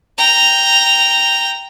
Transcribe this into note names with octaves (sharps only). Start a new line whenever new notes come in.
G5 A#5